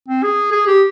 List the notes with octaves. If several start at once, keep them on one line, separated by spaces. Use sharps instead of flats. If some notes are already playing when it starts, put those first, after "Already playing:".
C4
G#4
G#4
G4